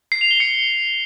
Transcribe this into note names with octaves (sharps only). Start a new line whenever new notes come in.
C7
F7
G7
C#7